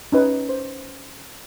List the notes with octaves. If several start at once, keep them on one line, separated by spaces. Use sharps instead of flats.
C#4 D#4 B4
C5